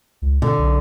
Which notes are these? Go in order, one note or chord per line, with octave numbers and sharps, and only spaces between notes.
C#2
B2 D3
B1